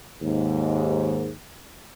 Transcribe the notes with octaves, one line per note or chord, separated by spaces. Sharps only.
D#2 G#2